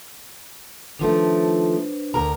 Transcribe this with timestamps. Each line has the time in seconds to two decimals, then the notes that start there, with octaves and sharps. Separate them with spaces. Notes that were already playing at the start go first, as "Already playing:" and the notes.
0.99 D#3 F3 A3 D4 B4 C5
2.14 D2 A#4 A#5